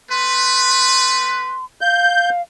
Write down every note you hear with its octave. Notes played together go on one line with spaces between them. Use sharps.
A3 B4 C6
F5 G6